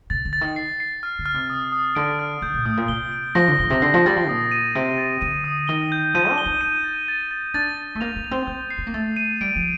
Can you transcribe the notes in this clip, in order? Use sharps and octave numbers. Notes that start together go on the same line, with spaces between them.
C3 A6
D3
A6
D#3
C7
C7
F6
D3
F6
C3
D#6
D#6
D3 D7
F6
D3 G6
A#2
A2 D#6
A#2
C3 G7
D7
F3 A#6
D3
A2 G7
C3
D3 C7
F3
G3 A6
F3
A#2 D#6
D#7
C3 D7
A6
D3 D#7
D#6
D#3 G7
G6
F3 D#7
D4
G7
D#4
D#7
A6
A6
A6
D4 A6
A6
A3
A#3 F7
A#3
F7
C4
A#3 G6
C7
C4
A#3
A3 A6
D#7
G3 D7
F3